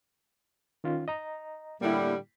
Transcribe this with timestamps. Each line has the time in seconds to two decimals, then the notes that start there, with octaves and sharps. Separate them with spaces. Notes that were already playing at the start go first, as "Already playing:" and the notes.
0.84 D#3 C#4 F4
1.08 D#5 A#5
1.81 A2 D3 G3 A#3 E4